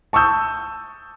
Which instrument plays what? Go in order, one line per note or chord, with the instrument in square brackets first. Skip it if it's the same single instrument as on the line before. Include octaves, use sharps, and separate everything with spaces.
[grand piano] A5 C#6 D#6 E6 G6